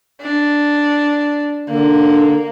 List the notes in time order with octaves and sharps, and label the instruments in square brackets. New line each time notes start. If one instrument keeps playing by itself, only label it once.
[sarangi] D4
[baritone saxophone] D3 [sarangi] A#3